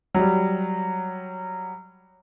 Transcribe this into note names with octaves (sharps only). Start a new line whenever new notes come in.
F#3 G3